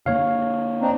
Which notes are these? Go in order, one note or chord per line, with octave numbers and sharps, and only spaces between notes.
D3 A#3 C#5 F5
C4 D4 D#4